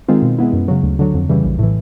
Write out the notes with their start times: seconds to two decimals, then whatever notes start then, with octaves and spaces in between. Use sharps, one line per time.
0.08 D#3 G#3 C4 F4
0.23 B2
0.38 G#3 B3 E4
0.53 F#2
0.68 C#3 F#3
0.83 D2
0.99 D3 F#3
1.14 F2
1.30 C#3 E3 G3
1.44 A#1
1.59 A2 E3